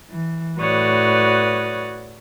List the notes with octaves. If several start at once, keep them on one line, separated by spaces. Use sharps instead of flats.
E3
A2 F#4 B4 C#5 D5 D#6